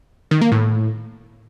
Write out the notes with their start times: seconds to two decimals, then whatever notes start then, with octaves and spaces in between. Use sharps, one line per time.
0.31 D#3
0.41 A#3
0.52 A2